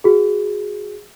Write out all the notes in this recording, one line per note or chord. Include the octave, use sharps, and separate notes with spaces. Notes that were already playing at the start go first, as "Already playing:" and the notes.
F#4 G#4